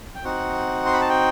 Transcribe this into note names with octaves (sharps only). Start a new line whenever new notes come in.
G5
C4 D#4 F#4 F#5
C6
B5
A5
G5